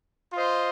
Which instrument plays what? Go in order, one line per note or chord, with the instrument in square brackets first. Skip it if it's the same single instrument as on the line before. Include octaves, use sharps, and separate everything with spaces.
[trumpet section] F4 C5 D#5